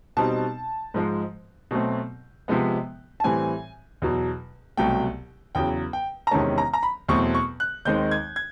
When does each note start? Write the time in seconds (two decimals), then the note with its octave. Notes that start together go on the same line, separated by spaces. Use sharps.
0.17 B2 G3 C4 D#4 A5
0.94 G#2 F3 G#3
1.71 B2 F#3 A3 C4
2.48 C3 F3 G#3 B3
3.20 A5
3.24 A2 E3 G3 C4 G#5
4.02 E2 B2 F#3
4.77 C2 B2 F#3 A3 G5
5.55 E2 C#3 F#3 G5
5.93 G5
6.27 A#5
6.31 E2 C3 D#3 G#3 C#4 A5
6.58 A#5
6.73 A#5
6.83 B5
7.08 E2 B2 F#3 A3 C4 C#6
7.34 C#6
7.60 F#6
7.85 D#2 D#3 G#3 C4 D#4 G6
8.11 G#6
8.36 G#6